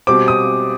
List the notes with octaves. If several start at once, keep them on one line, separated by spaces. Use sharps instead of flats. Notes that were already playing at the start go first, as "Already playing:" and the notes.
B2 G3 C4 D6
D#6